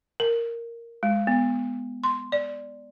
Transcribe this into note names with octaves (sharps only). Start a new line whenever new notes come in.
A#4
G#3
B3
C6
D5